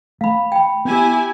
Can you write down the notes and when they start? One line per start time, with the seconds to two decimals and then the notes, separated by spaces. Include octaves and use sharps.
0.21 A3 F5 B5
0.52 G5 B5
0.85 B3 E4 G4 G#5